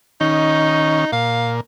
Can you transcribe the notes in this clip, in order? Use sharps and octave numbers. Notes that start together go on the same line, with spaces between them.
D#3 C#4 D#4
A#2 F5